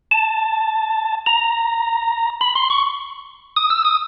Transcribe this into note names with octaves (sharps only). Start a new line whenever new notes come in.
A5
A#5
B5
C6
C#6
D#6
E6
D#6